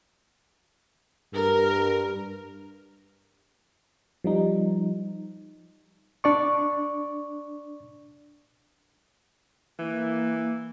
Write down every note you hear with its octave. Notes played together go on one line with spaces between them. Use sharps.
G2 A#4
F3 G3 D#4
D4 D5 C#6
E3 A#3